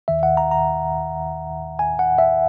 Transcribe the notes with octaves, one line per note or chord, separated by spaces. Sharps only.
D#2 D#3 E5
F#5
A#5
A#5
G#5
F#5
E5